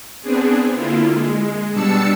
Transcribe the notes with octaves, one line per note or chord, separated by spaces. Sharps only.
B3 C4 D4 G#4
D3 A#3 E4 F4
G#3
B2 G3 D4 A5 E6 C#7